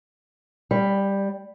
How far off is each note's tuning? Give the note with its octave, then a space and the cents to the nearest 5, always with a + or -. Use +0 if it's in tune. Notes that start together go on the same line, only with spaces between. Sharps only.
G3 +10